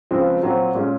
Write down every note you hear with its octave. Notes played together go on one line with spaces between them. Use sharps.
C#2 C#3 F3 C4
A#2 F#3 C4
A#2 G#3 C#4 G#4